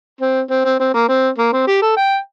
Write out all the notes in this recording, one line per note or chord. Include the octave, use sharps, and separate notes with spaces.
C4
C4
C4
C4
A#3
C4
A#3
C4
G4
A4
G5